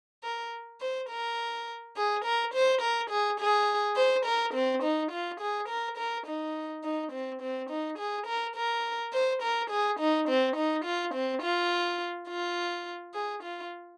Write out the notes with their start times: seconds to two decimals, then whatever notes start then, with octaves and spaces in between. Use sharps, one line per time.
0.23 A#4
0.80 C5
1.10 A#4
1.96 G#4
2.24 A#4
2.54 C5
2.81 A#4
3.10 G#4
3.40 G#4
3.96 C5
4.25 A#4
4.54 C4
4.82 D#4
5.11 F4
5.40 G#4
5.68 A#4
5.97 A#4
6.27 D#4
6.83 D#4
7.12 C4
7.41 C4
7.70 D#4
7.98 G#4
8.26 A#4
8.55 A#4
9.12 C5
9.42 A#4
9.70 G#4
9.99 D#4
10.28 C4
10.56 D#4
10.85 F4
11.14 C4
11.42 F4
12.29 F4
13.14 G#4
13.43 F4